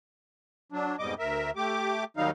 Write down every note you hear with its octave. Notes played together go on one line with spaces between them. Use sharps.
F#3 D4
F2 G#2 B2 G3 D#5 D6
D2 A#4 E5
A3 G4 D6
D#2 D#3 F#3 G3 D#4 F5